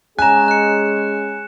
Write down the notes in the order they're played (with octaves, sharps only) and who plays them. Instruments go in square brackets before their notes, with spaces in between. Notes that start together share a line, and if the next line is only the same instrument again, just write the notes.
[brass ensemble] G#3 C#4 G#4 [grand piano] G#5 A#5 [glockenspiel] F#6 E7
[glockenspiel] F#6 C#7